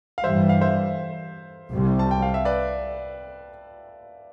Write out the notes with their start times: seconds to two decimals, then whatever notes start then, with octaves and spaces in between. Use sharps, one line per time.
0.18 F5
0.24 G2 E3 G3 C5 E5
0.49 F5
0.61 C5 E5
1.72 C2 C3 G3
1.99 A5
2.11 G5
2.22 F5
2.34 E5
2.45 B4 D5